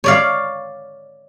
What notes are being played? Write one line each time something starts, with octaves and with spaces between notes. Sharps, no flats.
C#5 D5 F5